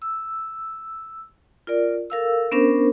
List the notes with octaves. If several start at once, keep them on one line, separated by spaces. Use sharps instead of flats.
E6
F4 A#4 D5
A4 A#4 F5 E6
B3 C#4 D4 A#4 C5